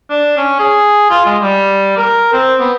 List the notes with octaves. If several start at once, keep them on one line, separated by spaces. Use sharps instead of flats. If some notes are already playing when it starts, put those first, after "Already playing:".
D4
C#4
G#4
F4
G#3
G3
A#4
C4
B3